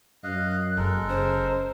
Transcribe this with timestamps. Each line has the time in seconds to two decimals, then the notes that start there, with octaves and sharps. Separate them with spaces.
0.24 F#2 D#5 F5 F#6
0.77 F#1 G#3 A4 A#4
1.09 C#3 C5